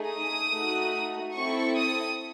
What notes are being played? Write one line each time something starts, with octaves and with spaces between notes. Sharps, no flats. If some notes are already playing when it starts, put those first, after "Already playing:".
Already playing: A3 D#4 G#4
D#6
A3 D#4 F#4
C4 E4 A4 C#6
D#6